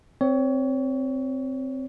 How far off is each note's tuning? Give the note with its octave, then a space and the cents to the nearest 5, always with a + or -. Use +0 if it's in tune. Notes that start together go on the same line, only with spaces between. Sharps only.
C4 +0 C#5 +25